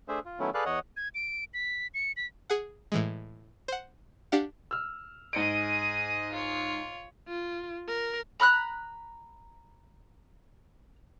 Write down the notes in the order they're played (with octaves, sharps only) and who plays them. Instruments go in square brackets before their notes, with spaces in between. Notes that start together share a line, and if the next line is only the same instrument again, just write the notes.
[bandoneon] A3 D4 G#4 C5 E5
F4
D#3 F#3 A3 B3 C#4 E4
G#4 A4 B4 D5 F5 F#6
E2 C#5 D#5 F#5
[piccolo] G#6
D7
B6
C#7
B6
[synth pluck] G#4 F#5
A2 E3 G#3
C5 F#5
D4 G4 F5 F#5
[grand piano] E6 F6
[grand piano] G#2 C#7 D7 [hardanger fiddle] G#4 D#5
[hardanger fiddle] F4 C#5
[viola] F4
A#4
[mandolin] A#5 B5 F6 F#6